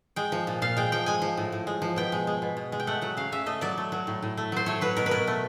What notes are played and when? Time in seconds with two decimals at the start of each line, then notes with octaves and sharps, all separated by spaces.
0.16 G#3 G5
0.32 F3
0.47 A#2
0.62 A#2 F5
0.77 G#3 G5
0.92 F3 G5
1.06 G#3 G#5
1.22 F3
1.37 A2
1.52 A2
1.67 G#3
1.82 F3
1.96 B2 G5
2.12 G#3
2.27 G#3
2.42 B2
2.57 B2
2.72 G#3
2.80 G5
2.87 A3 F#5
3.01 F#3 F#5
3.17 C#3 F5
3.32 C#3 E5
3.46 A3 D#5
3.61 F#3 D5
3.78 A3
3.92 F#3
4.07 A2
4.22 A2
4.37 A3
4.52 F#3 C5
4.66 A3 C#5
4.81 F#3 B4
4.97 B2 A#4
5.06 B4
5.11 B2 A#4
5.27 A3